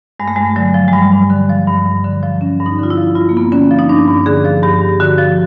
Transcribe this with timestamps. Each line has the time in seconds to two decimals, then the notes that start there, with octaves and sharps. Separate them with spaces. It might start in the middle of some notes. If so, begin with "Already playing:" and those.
0.20 G2 G#3
0.28 A3
0.36 G2 G#3
0.56 D3 F#3
0.74 F3
0.88 G#3
0.93 G2 G3
1.12 G2
1.30 D3
1.49 F3
1.67 G2
1.86 G2
2.04 D3
2.23 F3
2.41 G2 C#4
2.60 G2
2.66 D#4
2.79 D3 F4
2.90 E4
2.97 F3
3.15 G2 F4
3.29 A#3
3.34 G2 B3
3.44 C4
3.52 D3 C#4
3.71 F3
3.79 D#4
3.89 G2 D4
4.07 G2
4.26 D3 G#4
4.45 F3
4.63 G2 G4
4.82 G2
5.00 D3 F#4
5.18 F3